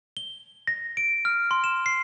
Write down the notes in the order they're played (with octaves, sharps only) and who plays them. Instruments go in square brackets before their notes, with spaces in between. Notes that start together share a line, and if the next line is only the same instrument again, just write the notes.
[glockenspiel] G7
A#6
D7
F6
C6
E7
C7